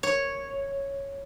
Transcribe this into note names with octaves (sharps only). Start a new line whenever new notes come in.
C#5